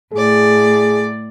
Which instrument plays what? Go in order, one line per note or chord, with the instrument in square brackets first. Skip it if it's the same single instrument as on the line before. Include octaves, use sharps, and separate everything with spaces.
[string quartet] A2 D5 [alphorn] G#4